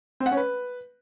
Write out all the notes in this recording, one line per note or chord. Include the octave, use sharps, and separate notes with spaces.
C4
F#5
C#4
B4